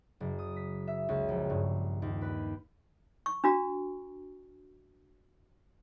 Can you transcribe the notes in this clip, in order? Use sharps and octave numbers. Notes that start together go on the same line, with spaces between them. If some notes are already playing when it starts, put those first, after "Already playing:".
F#1
D#6
B6
E5
C#2
A#1
G2
D#2
B4
C#6
D4 F#4 A#5